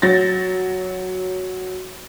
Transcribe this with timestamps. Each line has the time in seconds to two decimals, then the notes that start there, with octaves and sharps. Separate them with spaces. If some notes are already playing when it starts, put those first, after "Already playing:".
0.02 F#3 A6 A#6